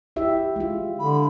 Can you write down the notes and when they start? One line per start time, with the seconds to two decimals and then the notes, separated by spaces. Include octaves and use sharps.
0.16 E4 G4 E5
0.56 G#3 F4
0.99 D3 B5